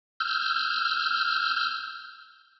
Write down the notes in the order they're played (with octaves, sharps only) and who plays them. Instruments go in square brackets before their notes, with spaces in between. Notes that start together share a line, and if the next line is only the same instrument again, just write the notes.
[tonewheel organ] E6 F6 G6